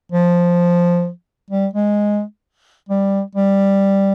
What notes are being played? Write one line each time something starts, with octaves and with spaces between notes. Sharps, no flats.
F3
G3
G#3
G3
G3